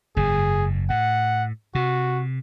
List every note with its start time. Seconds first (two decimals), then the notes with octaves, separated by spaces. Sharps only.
0.17 F#1 G#2 G#4
0.90 A2 F#5
1.75 C3 F#4